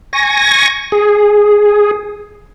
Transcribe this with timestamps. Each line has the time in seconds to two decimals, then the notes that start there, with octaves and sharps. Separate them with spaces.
0.13 G#5 C#6 A#6
0.92 G#4